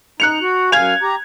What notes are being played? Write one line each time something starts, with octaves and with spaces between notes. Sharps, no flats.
D#4 F#6 C#7 F7
F#4
F#2 F5 G#5 G#6 F7
G4 A#5